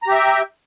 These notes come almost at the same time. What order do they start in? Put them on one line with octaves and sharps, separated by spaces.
A#5 G4 E5 G5